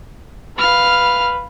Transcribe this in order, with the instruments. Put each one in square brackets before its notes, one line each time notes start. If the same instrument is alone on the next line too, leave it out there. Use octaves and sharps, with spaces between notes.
[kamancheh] B4 [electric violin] F5 F6